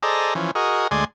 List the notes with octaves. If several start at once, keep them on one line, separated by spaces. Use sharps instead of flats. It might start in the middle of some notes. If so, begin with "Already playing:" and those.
G#4 A4 C5 D5 D#5 A#5
E3 F3 C#4
F#4 G#4 A#4 D#5
D2 G#3 D5 G#5 C6